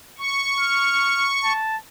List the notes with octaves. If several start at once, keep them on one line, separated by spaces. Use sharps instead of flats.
C#6
F6
A5